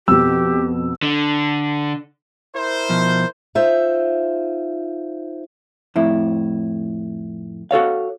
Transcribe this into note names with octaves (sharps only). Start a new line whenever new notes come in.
F2 B2 G4 E6
D3
E4 A#4 C5
B2 F3
D#4 F4 C5 E5
F2 A2 E4
F#4 A4 C#5 F5